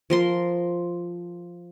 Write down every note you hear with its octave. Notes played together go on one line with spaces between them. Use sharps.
F3 A#4 C6